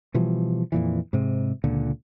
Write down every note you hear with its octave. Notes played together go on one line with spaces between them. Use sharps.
B2 E3 F3 G3
F2 A#2 E3
G#2 C3
C#2 A#2 D3